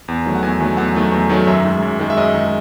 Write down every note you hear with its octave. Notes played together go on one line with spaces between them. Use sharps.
E2
D#3 F#3 A3
F#5
E2 G#5
D#3 F#3 A3
E2 F#5
D#3 F#3 A3
E2
D#3 F#3 A3
F#2 E5
D#3 G#3
F#2
D#3 G#3
E5
F#2 D#5
D#3 G#3